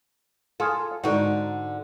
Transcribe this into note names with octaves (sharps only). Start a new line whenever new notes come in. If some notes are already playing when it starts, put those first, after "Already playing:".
F4 G#4 A4
G#2 D3 D#4 F#4